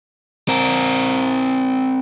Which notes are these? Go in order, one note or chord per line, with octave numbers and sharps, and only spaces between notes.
C4 A#4